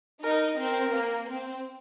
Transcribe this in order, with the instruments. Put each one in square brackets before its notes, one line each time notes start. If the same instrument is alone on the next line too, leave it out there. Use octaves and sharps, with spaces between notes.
[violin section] D#4 [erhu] A#4
[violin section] C4 [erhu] A#4
[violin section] A#3
C4